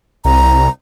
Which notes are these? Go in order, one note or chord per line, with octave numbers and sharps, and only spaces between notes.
C2 A#5